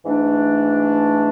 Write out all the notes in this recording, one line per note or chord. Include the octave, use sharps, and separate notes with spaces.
G#2 E3 A3 D4